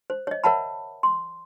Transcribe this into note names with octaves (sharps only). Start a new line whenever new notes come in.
C5
C#5 D#5
A#4 C#5 E5 F#5 A5 B5
C6